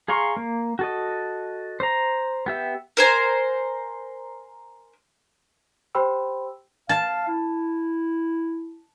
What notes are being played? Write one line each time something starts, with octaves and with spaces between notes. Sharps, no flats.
G#4 F5 A#5 C6 C#6
A#3
F#4 A4 D#5
C5 A#5
B3 G4 E5
A#4 C5 G#5
G4 C5 G5 B5 C6 E6
F5 A5
E4